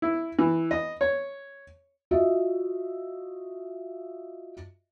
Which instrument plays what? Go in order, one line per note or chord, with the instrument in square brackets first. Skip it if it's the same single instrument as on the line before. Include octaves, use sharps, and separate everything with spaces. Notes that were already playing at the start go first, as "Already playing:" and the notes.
[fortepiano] E4
E3
D#5
C#5
[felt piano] F4 F#4 D#5 E5